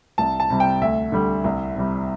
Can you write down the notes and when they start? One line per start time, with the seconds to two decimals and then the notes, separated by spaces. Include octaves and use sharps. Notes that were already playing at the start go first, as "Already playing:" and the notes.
0.18 C2 A5
0.40 A5
0.50 C3 G3
0.60 G5
0.81 D2 E5
1.12 D3 G3
1.44 C2
1.76 C3 G3